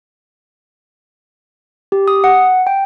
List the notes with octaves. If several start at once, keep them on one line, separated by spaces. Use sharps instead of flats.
G4
D#6
F#5
G5